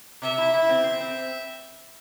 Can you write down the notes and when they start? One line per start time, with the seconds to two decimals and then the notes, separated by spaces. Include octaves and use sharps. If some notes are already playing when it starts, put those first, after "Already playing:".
0.22 C3 E5
0.38 E4
0.54 E4
0.69 C4
0.84 C4
1.01 C4